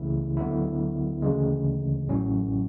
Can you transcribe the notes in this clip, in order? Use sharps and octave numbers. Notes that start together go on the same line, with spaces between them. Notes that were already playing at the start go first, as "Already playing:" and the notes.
Already playing: C#2 C#3 E3 A3 E4
D2 D3 F#3 B3 E4
D2 C#3 E3 G#3
A1 A2 F#3 C#4